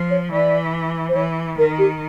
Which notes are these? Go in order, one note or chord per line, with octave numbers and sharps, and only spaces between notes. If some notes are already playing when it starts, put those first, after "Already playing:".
Already playing: F3
C#5
E3 D5
C5
E3 C#5
D#3 A#4
G4